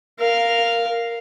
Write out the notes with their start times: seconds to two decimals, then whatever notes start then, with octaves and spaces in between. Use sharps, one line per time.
0.19 A#4 F5